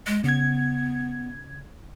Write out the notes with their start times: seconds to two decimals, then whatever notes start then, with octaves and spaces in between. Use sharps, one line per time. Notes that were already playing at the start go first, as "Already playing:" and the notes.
0.07 G#3
0.24 C#3 B3 G#6